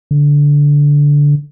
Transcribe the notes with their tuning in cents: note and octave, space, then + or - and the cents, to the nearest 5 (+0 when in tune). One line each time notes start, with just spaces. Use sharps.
D3 -15